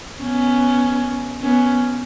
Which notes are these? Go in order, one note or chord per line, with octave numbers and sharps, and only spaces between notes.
B3 C#4
B3 C#4